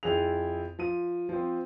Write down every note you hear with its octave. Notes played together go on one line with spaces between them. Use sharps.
F2 E4 G#4 F7
F3 D#7
F3 C4